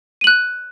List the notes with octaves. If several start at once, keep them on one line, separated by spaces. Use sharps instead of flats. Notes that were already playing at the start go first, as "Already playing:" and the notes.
F#6 D#7 F#7